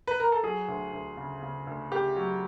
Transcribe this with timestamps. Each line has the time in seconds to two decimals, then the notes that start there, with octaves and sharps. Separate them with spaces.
0.07 B4
0.20 A#4
0.32 A4
0.43 F#3 G#4
0.68 D2
0.93 D2
1.17 C#3
1.43 C#3
1.67 D2
1.91 C#3 G4
2.16 F#3